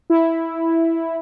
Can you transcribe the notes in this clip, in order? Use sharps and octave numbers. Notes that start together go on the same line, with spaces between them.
E4